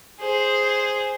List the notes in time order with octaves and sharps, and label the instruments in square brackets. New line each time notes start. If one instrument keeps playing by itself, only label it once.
[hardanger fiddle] G#4 C5